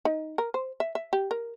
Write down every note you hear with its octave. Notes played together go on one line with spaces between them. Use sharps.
D#4
A#4
C5
E5
E5
G4
A#4